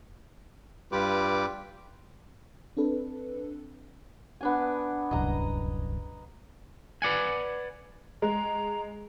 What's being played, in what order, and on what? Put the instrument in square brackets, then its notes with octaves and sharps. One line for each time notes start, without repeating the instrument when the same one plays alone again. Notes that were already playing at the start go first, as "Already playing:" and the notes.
[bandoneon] G2 G3 F4 G4 B4 D6
[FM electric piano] C4 D4 A4 B4
[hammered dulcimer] B3 D4 G#5
[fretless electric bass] D1 C2 F#2 [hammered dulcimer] D#5 A#5
[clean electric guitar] B4 D5 F#5 G#5
[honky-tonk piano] G#3 [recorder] A#5